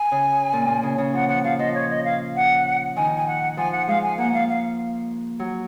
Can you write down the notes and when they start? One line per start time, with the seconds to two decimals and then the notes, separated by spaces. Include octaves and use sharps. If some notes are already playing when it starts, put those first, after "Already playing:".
Already playing: G#5
0.12 C#3
0.53 A#2
0.68 A#2
0.83 C#3
0.98 C#3
1.13 F3 F#5
1.28 F3 F#5
1.44 F3 F5
1.59 F3 D#5
1.75 C#5
1.90 D#5
2.05 F5
2.36 F#5
2.96 D#3 G#5
3.16 G#5
3.27 F#5
3.57 F3 G#5
3.72 F#5
3.88 G#3 F5
4.03 G#5
4.18 A#3 F#5
4.33 F5
4.49 F5
5.39 F#3